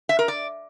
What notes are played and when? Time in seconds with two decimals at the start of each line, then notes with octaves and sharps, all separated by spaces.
0.09 E5
0.19 A#4
0.28 D5